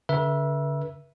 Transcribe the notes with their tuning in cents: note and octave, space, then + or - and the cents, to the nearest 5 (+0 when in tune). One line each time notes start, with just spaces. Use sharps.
D3 -40 B4 -40 E5 +5